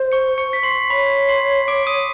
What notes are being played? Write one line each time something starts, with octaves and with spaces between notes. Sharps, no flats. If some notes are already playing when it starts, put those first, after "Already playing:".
Already playing: C5
C#6 C#7
C#6 C#7
B6
C6 C7
C#5 B5 B6
C6 C7
D6 D7
D#6 D#7